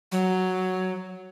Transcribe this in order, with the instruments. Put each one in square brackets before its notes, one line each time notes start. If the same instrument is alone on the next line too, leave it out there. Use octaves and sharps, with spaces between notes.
[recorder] F#3